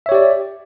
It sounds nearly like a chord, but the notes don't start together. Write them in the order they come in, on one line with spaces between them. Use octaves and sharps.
E5 C#5 G4 D5